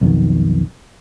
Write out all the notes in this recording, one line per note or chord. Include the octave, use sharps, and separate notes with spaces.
B1 F2 B2 D#3